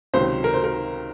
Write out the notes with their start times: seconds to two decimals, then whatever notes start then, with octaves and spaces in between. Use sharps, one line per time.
0.14 C#2 C3 D#3 F#3 C5
0.44 A#4
0.54 C5
0.64 A#4